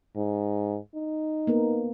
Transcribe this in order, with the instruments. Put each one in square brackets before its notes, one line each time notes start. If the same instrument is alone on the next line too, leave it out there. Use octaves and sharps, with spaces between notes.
[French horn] G#2
D#4
[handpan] A#3 B3 A#4